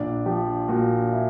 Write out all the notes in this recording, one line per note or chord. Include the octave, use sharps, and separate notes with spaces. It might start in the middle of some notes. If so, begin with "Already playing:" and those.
Already playing: A#1 D4
F3 G4
A#2 F#4
E4